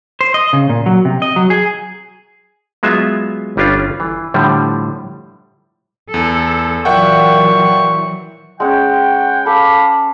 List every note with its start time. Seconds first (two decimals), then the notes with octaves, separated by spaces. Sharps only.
0.21 C5
0.34 D#5
0.53 C#3
0.70 A#2
0.86 F#3
1.05 C3
1.22 D#5
1.36 F#3
1.50 G#4
2.83 F#3 G#3 B3 F4 E5
3.57 G1 G3 C#4 D4 F4
4.00 E3
4.34 A2 D3 F3 G3
6.14 E2 A4
6.85 A#2 E3 F#3 E5 F#5 G5 C#6
8.60 G#3 C#4 F#5 G5
9.46 A4 F5 B5 D6